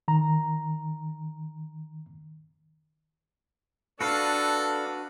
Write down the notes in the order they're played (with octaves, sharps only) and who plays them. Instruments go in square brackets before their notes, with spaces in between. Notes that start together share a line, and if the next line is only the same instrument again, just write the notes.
[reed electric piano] D#3 A#5
[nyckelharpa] D4 [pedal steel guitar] F#4 B4 F5 [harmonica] A4